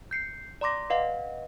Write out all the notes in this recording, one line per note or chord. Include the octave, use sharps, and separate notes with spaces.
G6 C7 C#7
D5 A#5 C6 D6 A#6
B4 D#5 F5 F#5